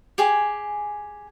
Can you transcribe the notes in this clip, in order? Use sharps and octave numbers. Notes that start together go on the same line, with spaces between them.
G4 G#4 G#5 D6